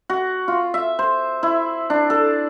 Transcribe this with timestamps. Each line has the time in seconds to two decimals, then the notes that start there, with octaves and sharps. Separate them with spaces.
0.10 F#4
0.48 F4
0.74 E5
0.99 C5
1.43 E4
1.90 D4
2.10 A4